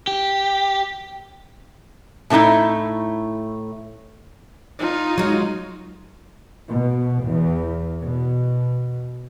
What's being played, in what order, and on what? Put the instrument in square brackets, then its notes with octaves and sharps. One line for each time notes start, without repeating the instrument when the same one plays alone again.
[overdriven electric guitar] G4
[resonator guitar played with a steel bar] A2 D3 A3 D#4 E4
[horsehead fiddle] D#4 F4
[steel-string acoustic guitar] F#3 G#3
[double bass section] B2
E2
B2